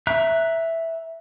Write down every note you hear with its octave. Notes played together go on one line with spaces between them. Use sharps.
E5 A#5 F#6